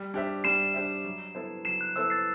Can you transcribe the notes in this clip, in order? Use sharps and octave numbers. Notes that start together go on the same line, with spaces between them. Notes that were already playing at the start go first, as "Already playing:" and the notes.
Already playing: G3
D4 G4 C5 E5
G3 C7 E7
D4 G4 C5 E5
F#3
B3 E4 A4 C5
F#3 C7 E7
F#6
B3 E4 A4 C5 E6
A6 C7